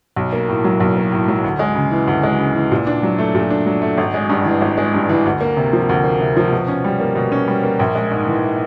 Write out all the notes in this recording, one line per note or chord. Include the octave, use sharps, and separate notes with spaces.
B1
A#3
A2
F#3
B1
A#3
A2
F#3
D2
G#3
C#3
E3
D2
G#3
C#3
E3
A#2
D4
F#3
A3
A#2
D4
F#3
A3
G#1
G#3
G2
E3
G#1
G#3
G2
E3
D2
A#3
C3
F3
D2
A#3
C3
F3
B2
C#4
G3
A#3
B2
C#4
G3
A#3
A#1
G#3
G#2
E3